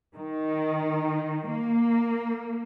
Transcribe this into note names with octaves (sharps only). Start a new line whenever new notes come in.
D#3
A#3